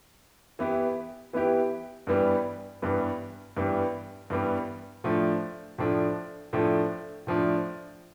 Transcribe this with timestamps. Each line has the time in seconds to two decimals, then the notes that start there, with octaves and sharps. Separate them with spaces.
0.59 E3 B3 E4 G4
1.33 E3 B3 E4 G4
2.07 G2 E3 G3 B3
2.82 G2 E3 G3 B3
3.57 G2 E3 G3 B3
4.30 G2 E3 G3 B3
5.04 A2 F3 A3 D4
5.78 A2 F3 A3 D4
6.53 A2 F3 A3 D4
7.27 A2 F3 A3 D4